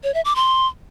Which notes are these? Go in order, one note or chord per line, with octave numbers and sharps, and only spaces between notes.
C#5
E5
D6
C6